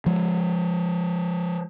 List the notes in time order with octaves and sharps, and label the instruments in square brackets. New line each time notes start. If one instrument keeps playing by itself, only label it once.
[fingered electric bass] F3 G#3